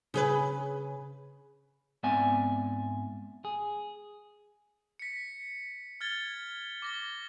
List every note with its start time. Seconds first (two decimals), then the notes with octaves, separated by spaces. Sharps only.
0.14 C#3 G#4 B4
2.03 G#2 B3 C4 D5 E5 G#5
3.45 G#4
4.99 B6 C#7
6.01 F6 G#6 A6 G7
6.82 D6 A#6 G7